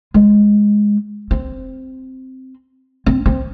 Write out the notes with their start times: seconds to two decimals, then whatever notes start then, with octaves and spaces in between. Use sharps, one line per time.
0.14 G#3
1.31 C4
3.06 C4
3.26 C4